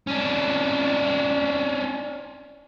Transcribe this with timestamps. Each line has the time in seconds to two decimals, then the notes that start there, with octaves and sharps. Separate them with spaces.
0.07 C#4 D4